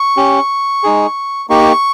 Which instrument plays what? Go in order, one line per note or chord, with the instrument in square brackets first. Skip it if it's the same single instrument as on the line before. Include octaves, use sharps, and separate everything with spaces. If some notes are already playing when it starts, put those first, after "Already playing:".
Already playing: [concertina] C#6
C#4 G4
G#3 D#4 G#4
A#3 D#4 G4 C#6